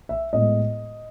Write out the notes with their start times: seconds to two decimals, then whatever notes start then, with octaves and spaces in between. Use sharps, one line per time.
0.09 E5
0.33 A2 G#3 B3 D#5